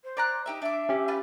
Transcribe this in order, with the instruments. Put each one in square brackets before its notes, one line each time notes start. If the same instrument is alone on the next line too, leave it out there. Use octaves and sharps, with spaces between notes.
[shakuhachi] C5
[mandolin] D5 A#5 F#6
D#4 G4 E5
[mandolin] D4 D6 [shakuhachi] E5
[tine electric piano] C#4 G4
[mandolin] F4 B4